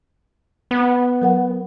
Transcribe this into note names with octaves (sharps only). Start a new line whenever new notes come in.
B3
F#3 A#4 F#5